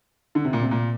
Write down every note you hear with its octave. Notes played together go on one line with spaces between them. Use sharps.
D3
C3
A#2
C3
A#2